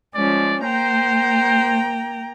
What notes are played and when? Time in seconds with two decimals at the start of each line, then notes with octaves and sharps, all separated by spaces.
0.14 F3 G#3 C#4 D5
0.63 A#3 C5 G5 A#5